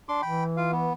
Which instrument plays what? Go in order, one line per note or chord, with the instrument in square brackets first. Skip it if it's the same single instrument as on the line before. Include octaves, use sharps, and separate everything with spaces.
[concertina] D4 C6 D6
[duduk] E3 [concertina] G5 B5
[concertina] F4 F5
B3